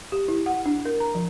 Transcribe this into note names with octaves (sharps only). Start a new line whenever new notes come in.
G4
E4
F#5
D4
A#4
A#5
F3